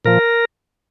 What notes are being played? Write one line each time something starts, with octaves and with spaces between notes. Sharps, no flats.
A#2 F3 A#4